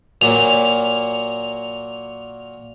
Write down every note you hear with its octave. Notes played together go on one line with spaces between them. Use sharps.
A#2 F#3 A#3 F7